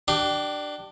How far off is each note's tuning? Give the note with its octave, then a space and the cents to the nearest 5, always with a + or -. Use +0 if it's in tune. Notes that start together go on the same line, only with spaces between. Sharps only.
D4 +15 G4 -20